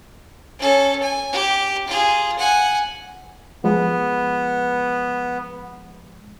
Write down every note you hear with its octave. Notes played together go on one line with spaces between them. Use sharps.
C#4 A4
G#5
G4
F4 G#4
F#5 G#5
F3 G#3 B3